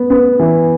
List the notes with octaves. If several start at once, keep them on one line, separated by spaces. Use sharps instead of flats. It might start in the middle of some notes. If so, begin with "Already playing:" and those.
Already playing: B3
B3
E3